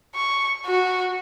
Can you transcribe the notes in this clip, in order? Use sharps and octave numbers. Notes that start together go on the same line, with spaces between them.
C#6
F#4